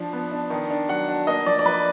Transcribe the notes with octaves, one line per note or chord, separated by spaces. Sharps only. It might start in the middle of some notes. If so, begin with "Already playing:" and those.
Already playing: F3 D4
B3
D4
D#3
D4
F#3 F#5
D4
A#3 D#5
F3 D5
D5
F3 B4